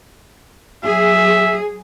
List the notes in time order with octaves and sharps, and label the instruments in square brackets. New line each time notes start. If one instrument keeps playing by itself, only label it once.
[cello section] F#3 G#4 [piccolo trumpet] E5